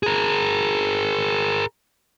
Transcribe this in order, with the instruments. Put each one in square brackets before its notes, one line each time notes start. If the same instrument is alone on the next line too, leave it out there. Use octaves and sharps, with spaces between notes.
[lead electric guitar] G#4 A#4